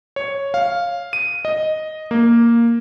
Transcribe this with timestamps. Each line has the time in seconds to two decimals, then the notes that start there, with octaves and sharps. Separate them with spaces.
0.16 C#5
0.54 F5
1.13 D#7
1.45 D#5
2.11 A#3